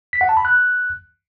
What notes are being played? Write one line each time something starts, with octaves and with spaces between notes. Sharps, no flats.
B6
F#5
A5
B5
F#6